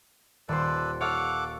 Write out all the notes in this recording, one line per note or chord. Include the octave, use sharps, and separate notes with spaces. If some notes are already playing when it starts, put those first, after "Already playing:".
D#1 A4 B4 C5 D5
A4 C#5 F5 F#5 D6